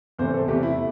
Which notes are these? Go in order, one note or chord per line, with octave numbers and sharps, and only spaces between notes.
E2 C3 A3 C5
A4
E2 C3 A3 G4
E4